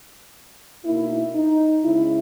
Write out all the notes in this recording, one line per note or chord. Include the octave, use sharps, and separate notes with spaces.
B2 A#3 D#4 E4
D#4
C#3 G#3 C#4 E4